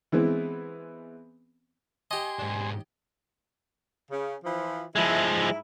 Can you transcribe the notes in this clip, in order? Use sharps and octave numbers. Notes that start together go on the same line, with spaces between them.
E3 G#3 B3 C4 E4
G4 D#5 G#5 C6
G#2 D4
C#3
E3 F3
F3 G#3 E4
G#2 E4